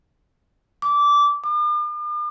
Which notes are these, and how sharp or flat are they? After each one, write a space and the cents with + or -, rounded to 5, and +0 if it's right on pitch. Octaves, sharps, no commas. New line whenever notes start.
D6 -15
D6 +45